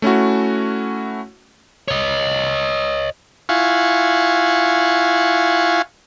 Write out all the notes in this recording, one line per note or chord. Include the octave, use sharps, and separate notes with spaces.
A3 C#4 E4 F#4
C#5 D#5
E4 F4 F5 F#5 G#5 C#6